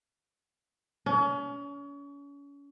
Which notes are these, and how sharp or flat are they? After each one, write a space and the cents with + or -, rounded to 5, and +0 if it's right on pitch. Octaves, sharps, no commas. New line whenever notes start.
C#4 +35